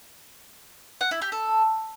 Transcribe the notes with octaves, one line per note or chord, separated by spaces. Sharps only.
F#5
E4
G4
A4